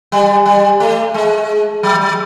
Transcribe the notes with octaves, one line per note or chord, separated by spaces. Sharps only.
G3
G3
A3
G#3
F#3
F#3